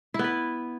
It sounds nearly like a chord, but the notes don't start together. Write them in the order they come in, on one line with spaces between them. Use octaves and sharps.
E4 B3 B4